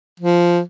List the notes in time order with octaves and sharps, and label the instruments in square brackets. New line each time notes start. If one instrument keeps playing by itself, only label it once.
[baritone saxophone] F3